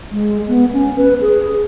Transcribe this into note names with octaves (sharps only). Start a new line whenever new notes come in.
G#3
B3
C#4
B4
G#4